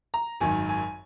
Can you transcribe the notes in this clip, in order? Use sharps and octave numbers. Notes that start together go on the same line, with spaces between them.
A#5
G#1 F#2 D#3 G#5
G#5